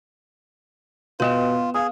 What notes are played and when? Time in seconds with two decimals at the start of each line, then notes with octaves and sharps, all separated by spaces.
1.20 B2 B3 F4 B4 D#5 E7
1.74 G#4 F5 D#6